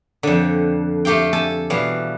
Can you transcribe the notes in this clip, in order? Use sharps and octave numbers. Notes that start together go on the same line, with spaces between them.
F2 D3
A3 G4 F5 G5
A4 G#5 A5
B2 E3 G3 F5